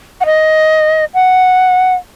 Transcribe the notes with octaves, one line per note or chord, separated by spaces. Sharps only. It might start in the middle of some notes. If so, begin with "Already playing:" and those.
F#5
D#5
F#5